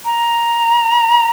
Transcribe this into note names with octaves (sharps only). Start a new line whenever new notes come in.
A#5